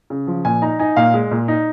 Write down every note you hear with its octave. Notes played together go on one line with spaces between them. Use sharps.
C#3
F3
A#2 G#5
D#4 A#5
D#4 G#5
A#2 F5
G#3
A#2
D#4